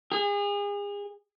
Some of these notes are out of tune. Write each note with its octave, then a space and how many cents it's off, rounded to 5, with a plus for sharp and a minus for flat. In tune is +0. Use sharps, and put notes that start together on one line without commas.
G#4 -35